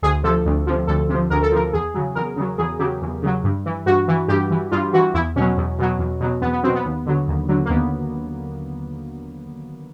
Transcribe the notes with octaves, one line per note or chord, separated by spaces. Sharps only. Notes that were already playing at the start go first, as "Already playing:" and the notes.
D2 G#4
C3 F3 A4
D2
C3 F3
D2 A4
C3 F3
D2 A#4
A4
C3 F3 A#4
E2 G#4
C#3 F#3
E2 A#4
C#3 F#3
E2 G#4
C#3 F#3 G4
E2
C#3 F#3
G2
E3
G2 F#4
E3
G2 G4
E3
G2 F4
E3 F#4
E2 E4
B2 F#3 C#4
E2
B2 F#3
E2
B2 F#3
E2 B3
B3
B2 F#3 C4
B3
D#2
D3 F#3
D#2
D3 F#3
A#3
D#2 B3